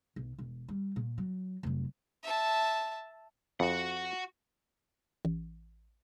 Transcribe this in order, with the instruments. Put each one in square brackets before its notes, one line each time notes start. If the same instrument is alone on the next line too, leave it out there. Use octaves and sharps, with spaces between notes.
[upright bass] B1
E1
G3
A#2
F#3
F1 F#3
[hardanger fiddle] E5 A5
[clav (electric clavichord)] F2 [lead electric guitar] F#4 F#5
[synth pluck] A1